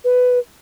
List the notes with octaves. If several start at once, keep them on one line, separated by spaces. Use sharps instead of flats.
B4